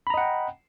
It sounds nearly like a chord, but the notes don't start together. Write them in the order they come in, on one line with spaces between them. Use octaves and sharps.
B5 A#5 D#5 F#5 G5